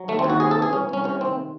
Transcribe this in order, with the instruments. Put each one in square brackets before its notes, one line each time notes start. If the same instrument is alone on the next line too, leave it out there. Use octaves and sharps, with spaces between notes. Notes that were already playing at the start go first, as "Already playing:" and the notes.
Already playing: [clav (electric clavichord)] F#3
D#2 A3
C4
D#2
F#4
C3 G#4
A4
E3
G#4
C2 C#4
C2 C#4
C3 C#4
D#3 C4